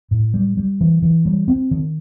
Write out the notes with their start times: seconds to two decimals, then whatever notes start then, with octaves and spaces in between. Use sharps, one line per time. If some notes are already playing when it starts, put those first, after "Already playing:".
0.11 A2
0.34 G3
0.57 G3
0.81 E3
1.02 E3
1.25 G3
1.48 C4
1.71 D#3